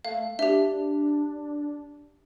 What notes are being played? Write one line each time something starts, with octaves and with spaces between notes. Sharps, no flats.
A3 F5
D4 G4 E5